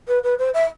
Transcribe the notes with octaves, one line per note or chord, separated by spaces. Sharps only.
B4
B4
C5
E5